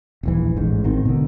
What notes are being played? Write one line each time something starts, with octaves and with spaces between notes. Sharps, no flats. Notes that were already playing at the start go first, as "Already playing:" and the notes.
D#1 A#1 E3
A1 G#2
G#1 D#3 C4
B2 D3